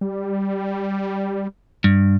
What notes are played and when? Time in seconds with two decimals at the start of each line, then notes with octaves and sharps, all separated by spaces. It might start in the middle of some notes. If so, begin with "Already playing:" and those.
0.01 G3
1.84 G2